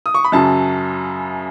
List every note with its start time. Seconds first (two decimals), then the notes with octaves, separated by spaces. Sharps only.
0.06 D#6
0.14 C#6
0.24 B5
0.32 F#2 C#3 F#3 A5